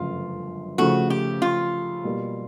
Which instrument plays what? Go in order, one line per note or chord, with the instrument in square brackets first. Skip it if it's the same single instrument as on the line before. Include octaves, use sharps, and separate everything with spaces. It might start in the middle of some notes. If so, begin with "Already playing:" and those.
Already playing: [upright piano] G1 F#2 C#3 F3 A3 [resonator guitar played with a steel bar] F4
[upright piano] C#3 F3 A3 [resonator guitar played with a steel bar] F#4
[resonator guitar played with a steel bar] G4
F4
[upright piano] B2 G3 A#3